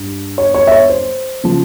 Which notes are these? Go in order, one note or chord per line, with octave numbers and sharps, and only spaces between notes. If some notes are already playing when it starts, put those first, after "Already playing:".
Already playing: G2
C#5
C#5
E5
C#5
C5
C#3 F3